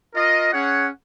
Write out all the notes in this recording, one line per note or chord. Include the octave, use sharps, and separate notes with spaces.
F4 A#4 D#5
C#4 G#4 C#5 F#5